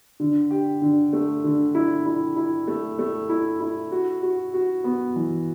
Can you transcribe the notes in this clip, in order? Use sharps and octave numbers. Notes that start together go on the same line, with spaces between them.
D3
G4
D3
A3
D3
E4
E4
E4
A3
A3
E4
E4
F#4
F#4
F#4
B3
E3